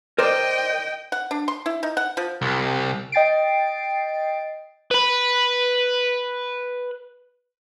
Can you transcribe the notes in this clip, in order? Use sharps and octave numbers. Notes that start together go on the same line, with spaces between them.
A#4 C5 D5 D#5 G5
F#5
D4
C6
E4
D#4
F#5
F3
C2
D#5 G5 A6 C7 D7
B4 B5